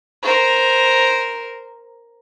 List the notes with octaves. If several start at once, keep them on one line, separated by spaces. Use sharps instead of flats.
A#4 C5